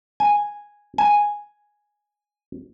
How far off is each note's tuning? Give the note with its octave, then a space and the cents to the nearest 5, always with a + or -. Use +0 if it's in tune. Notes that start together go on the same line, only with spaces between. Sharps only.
G#5 -5
G#5 +0